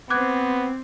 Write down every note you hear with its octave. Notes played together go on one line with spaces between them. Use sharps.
B3 C4 D6 F#6 G#6